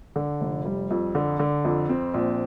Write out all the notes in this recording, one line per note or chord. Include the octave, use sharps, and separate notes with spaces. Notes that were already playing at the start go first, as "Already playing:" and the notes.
D3
F1
G3
F2
D3
D3
F2
C4
A#1